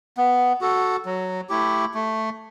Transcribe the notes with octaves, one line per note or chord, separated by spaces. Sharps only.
B3
F#4 A4
F#3
A3 E4 G4
A3